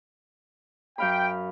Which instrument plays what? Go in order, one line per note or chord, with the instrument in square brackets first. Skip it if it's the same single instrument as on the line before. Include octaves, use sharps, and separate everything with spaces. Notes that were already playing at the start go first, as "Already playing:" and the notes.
[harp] F#2 F5 B5 [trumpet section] G5